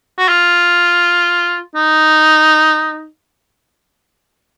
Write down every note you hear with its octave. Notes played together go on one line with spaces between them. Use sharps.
F#4
F4
D#4